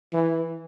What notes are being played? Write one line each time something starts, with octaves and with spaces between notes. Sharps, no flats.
E3